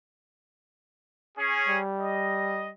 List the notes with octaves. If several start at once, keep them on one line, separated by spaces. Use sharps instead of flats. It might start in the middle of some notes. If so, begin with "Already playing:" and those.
C#4 G#4
G3
D#5